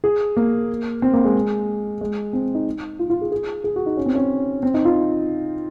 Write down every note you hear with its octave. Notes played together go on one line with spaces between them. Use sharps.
G#4
A#3
C4
A#3
G#3
G#3
C4
D#4
F4
F4
G#4
G#4
G#4
F#4
D#4
C#4
C4
C#4
C4
D#4
F4